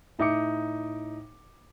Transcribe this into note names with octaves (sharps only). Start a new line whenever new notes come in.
A2 D#4 E5 D6 C#7